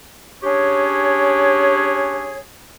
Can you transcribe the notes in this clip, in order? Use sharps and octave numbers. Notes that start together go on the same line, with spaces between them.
C#4 D4 G4 G#4 C#5